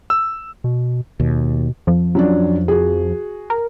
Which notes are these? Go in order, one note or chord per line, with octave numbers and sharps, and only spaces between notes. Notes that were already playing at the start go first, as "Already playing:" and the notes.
E6
B2
D#2 B2
F2 F3
F#3 C#4 D4
F#4 G#4
A#4